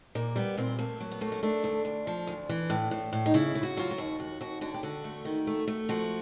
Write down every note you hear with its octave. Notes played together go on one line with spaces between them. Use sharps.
A#2 A#3
G3 B3
A#2 C4
A3 A#3
F#3
B3
A3 A#3
C#4
A3 D4
D2
D2
F3
D2
E3
A2
A2
A2
D#4
C#3 E4
C#3
F#4
F#3 F4
F#4
D#2
D#2 F#4
D#2 F#4
D3 F#4
G4
D3 F#4
A3
D#3
A3
A3
F3 F#4